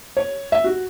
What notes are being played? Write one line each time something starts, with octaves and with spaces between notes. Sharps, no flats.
C#5
E5
F#4